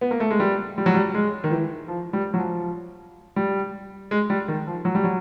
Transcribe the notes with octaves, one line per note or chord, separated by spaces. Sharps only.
B3
A#3
A3
G#3
G3
G3
F#3
G3
G#3
D#3
E3
F3
G3
F#3
F3
G3
G#3
G3
D#3
F3
F#3
G3
F#3